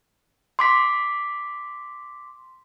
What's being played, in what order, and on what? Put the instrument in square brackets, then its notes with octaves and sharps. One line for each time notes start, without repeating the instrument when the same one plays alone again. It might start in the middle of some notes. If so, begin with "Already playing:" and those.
[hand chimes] C6 D6 B6